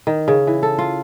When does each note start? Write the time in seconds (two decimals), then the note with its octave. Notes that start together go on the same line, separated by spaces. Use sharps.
0.07 D#3
0.28 C#3
0.47 E3
0.63 A4
0.78 F4